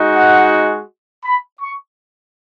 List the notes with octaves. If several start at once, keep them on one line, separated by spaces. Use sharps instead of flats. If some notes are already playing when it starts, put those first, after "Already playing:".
Already playing: G#3 D#4 F#4
F#5
B5
C#6